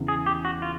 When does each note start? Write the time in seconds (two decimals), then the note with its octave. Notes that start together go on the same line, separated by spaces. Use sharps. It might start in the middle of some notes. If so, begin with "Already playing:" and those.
Already playing: E2 C#3
0.08 G#4
0.26 G4
0.45 F#4
0.62 F4